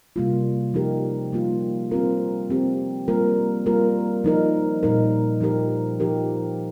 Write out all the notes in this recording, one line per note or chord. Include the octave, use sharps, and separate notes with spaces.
C3 G3 A#3 F4
F3 D#4 G4 A#4
G3 A#3 F4
G3 C4 F4 A#4
F3 C4 G4
G3 A#3 F4 A#4
G3 A#3 F4 A#4
F3 D#4 A#4
A#2 G3 D#4 A#4
F3 D#4 G4 A#4
F3 D#4 G4 A#4